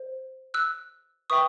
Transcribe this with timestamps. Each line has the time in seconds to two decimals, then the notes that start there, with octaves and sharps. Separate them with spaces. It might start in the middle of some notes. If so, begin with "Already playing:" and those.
Already playing: C5
0.54 E6 F#6
1.30 B4 E5 G5 C#6 D#6